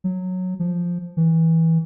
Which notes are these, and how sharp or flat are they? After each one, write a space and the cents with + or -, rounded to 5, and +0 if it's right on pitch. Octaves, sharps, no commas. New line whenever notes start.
F#3 -10
F3 +0
E3 -15